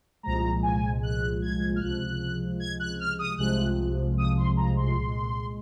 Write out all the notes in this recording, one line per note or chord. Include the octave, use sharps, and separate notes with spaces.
C2 A#2 F3 G#3 A#5
G#5
F#6
G#6
F6
C#2 C3 F3 G#3 F#6
G#6
F#6
F6
D#6
C2 C3 F3 G#3 F#6
D#6
C6
A#5
C6
C2 A#2 G#3